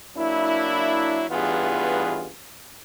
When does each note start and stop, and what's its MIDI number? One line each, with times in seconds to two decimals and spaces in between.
0.17 1.24 54
0.17 1.24 58
0.17 1.24 62
0.17 1.24 64
1.30 2.29 33
1.30 2.29 43
1.30 2.29 52
1.30 2.29 59
1.30 2.29 65
1.30 2.29 68